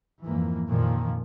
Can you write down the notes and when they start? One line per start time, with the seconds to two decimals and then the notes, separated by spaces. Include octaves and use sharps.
0.23 F2 G#2 E3 A#3
0.68 F2 A#2 D#3 F3